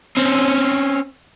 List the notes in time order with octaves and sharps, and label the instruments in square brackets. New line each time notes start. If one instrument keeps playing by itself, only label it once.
[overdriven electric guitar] C4 C#4